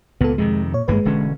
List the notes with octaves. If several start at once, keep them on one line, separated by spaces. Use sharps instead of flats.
C#2 A#2 B3 A4
F2 C3 D#3 G#3
A#2 C#5
G#1 G2 G#3 A#3 B4
E1 D3 C#4